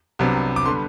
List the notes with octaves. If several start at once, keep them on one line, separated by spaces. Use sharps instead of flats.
C2 C3 F#3 B3 D4
D6
D3 G3 B3 C6